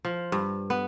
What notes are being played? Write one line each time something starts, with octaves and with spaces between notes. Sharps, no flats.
F3
G2
B3